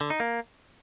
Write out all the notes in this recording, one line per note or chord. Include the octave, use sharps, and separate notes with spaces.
D3
D#4
A#3